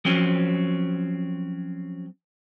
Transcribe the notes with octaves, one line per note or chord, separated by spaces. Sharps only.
F3 F#3 C4 C#4